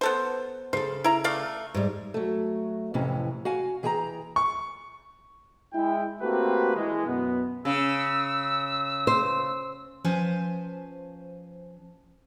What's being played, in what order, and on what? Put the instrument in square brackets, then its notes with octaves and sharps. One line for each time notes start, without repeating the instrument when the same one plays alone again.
[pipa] B3 A4 C5
[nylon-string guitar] C#3 A4 [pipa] C5
[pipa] E4 A#5
A3 D5 F5
[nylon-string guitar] G#2 G3
[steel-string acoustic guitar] F#3 A3
F2 A2 C3 E3 C#4
F#4 F5 G#5
E3 G#4 G5 G#5 A#5
[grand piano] C#6
[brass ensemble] G#3 E4 G5
A3 A#3 C4 F#4 G4 B4
E3 G#3
F#2 B2 B3
[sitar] C#3 [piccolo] E6
[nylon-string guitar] C5
[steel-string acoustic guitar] F3 C#4 B4 C5 G#5